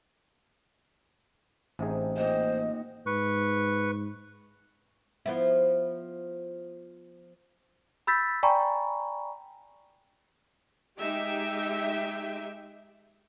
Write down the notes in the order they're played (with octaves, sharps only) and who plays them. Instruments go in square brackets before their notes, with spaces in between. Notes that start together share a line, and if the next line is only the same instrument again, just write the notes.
[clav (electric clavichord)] A1 G#4 [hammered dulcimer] C3 D#4
[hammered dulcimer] A#2 F#5 G5 [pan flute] C5 [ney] D#5
[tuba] G#2 [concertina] B4 C#6
[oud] F3 B3 E4
[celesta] B5 E6 G6 A6 B6
D5 G5 G#5 A#5 B5 C#6
[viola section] G#3 D#4 G4 E5 G5